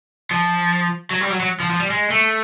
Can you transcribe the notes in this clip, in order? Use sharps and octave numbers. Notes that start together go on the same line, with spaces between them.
F3
F#3
G3
F#3
F#3
F3
F3
G3
G#3
A3